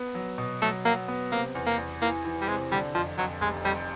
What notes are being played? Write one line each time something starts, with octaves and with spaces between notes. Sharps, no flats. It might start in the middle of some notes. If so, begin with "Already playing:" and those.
Already playing: B3
F#3
B2
F#3 A3
F#3 A#3
B3
C3 A#3
E2
A#3
E2
E3 A#3
E3
G3
C3 G#3
D3 G3
F2 F3
F2 F#3
F1 G#3
F2 G3